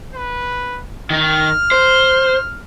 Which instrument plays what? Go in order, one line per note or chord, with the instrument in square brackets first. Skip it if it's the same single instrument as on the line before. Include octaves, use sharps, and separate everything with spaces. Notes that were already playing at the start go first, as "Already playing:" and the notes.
[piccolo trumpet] B4
[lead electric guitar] D#3 D#4 [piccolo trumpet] F6
[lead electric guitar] C5